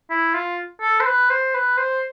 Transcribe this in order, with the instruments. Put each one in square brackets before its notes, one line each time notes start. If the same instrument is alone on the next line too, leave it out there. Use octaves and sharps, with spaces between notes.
[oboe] E4
F4
A4
C5
B4
C5
B4
C5